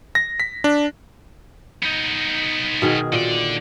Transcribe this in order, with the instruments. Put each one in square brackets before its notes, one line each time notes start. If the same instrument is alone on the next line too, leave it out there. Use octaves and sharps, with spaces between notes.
[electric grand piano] A#6
B6
D4
[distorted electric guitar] B3 D#4
[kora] B2 D#3 G#4
[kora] A#2 [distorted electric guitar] D3 D5